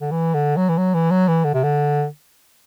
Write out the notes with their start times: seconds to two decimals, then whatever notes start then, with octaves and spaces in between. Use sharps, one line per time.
0.01 D3
0.12 E3
0.34 D3
0.57 F#3
0.69 E3
0.78 F#3
0.94 E3
1.11 F#3
1.28 E3
1.45 D3
1.54 C3
1.64 D3